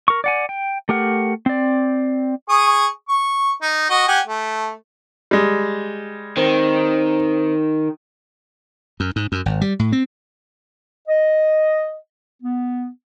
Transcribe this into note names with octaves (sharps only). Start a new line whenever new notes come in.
A#4 C#6
D5 F#5 G#5
G5
A3 G4 A#4 F#5
C4 D5
G#4 C#6 D#6
C#6
D#4
F#4 D#5
G4 F#5 G#5
A3
G3 G#3
D#3 C4
F#2
G#2
F#2
G#1
G3
A2
C4
D#5
B3